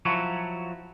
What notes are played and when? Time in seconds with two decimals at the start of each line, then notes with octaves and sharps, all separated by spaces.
0.05 F3 F#3 E4 F#4 C#5